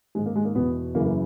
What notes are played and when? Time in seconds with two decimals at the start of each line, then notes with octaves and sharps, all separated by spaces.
0.15 D#3 G#3
0.18 G#2
0.26 A#3
0.36 G#3
0.45 A#3
0.55 E2 B2 B3
0.95 F#2 C#3 E3 A#3
1.05 A#3